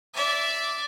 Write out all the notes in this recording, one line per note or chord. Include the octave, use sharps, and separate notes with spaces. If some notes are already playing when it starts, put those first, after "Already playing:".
D5 E5